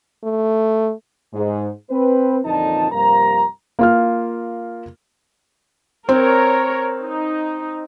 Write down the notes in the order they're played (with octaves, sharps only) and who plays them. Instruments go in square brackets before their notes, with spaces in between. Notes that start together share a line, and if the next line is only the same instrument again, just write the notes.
[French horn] A3
[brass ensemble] G#2
C4 B4
F2 A#2 D3 E3 D#4 A5
G2 C3 F3 A#3 A#4 A#5
[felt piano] A#3 F4 F6
[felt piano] C4 [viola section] A#4 C#5
[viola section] D#4